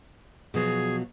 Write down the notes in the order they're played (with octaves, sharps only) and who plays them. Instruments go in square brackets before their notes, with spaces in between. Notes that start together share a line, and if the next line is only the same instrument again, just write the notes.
[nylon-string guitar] B2 F3 F#3 [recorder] G#4